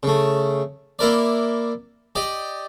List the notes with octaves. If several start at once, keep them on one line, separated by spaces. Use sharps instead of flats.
C#3 A3
A#3 E4 A#4 D5
G4 D5 D#5